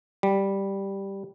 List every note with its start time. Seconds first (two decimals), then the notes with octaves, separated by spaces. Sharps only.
0.23 G3